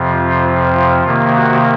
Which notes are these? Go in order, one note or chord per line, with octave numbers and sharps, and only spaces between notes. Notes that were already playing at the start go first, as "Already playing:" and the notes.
Already playing: F2 C3 F3
F4
F4
C3 D#3 A#3
F#4